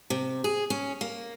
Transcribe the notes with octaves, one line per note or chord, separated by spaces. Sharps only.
C3
G#4
C#4
A#3